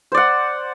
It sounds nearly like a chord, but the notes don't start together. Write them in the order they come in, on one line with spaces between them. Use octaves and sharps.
C5 D5 F#5